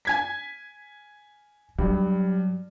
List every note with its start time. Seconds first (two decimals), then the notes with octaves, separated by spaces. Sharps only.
0.05 G#5 G#6 B6
1.79 G2 F#3